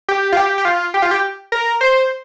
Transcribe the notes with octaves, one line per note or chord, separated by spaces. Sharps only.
G4
F4
G4
G4
F4
G4
F4
G4
A#4
C5